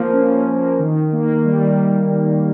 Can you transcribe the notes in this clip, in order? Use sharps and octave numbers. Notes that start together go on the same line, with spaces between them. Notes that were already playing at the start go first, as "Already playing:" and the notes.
Already playing: F3 A#3
C#4
A#3
D#3
A#3
G3